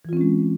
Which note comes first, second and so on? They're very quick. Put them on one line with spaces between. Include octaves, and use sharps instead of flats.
E3 F4 C4 C#4 G#3